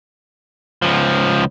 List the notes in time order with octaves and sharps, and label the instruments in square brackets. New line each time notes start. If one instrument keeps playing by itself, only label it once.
[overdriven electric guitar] C#2 F3